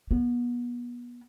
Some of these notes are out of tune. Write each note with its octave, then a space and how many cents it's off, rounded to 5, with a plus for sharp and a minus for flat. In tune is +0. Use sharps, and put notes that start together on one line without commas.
B3 -30